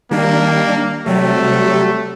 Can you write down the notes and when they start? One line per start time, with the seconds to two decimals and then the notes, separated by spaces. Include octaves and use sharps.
0.11 D#3 G3 A#3 D4
1.06 C3 F#3 G3 A3